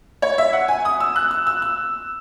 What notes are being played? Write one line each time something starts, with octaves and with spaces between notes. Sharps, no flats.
C#5
E5
F#5
G#5
D#6
E6
F#6
E6
E6
E6